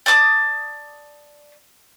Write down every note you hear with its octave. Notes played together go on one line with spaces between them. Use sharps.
D5 A5 D6 D#6